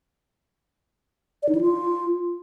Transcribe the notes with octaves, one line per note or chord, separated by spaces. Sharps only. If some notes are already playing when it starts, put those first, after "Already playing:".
D5
D#4
E4
F4